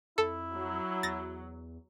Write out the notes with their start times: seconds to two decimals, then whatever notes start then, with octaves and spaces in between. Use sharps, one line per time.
0.18 F2 E4 A4
0.55 F#3
1.03 E2 A6 A#6